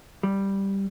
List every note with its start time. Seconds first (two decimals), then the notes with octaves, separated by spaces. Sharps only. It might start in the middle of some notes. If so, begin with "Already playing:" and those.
0.23 G3